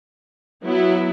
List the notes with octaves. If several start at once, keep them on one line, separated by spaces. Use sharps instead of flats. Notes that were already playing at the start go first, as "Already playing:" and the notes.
F#3 B3 E4